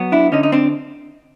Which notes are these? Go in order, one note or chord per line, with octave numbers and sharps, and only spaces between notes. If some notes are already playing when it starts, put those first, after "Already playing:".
Already playing: F#3 B3
D4 E4
D3 C#4 D#4
D#4
C4 D4